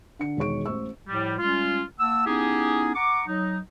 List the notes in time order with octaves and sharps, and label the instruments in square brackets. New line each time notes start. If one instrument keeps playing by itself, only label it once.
[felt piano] D3 C#7
E1 D#3 G#4 C#5 C#6 D7
A1 A2 C5 C#6 E6
[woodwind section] A2 F3 G3
G3 G#3 C#4 F4
A#3 F#5 A5 E6
B3 C#4 D#4 E4 G4 G#4
F#5 A#5 C#6 D6
F#3 D#4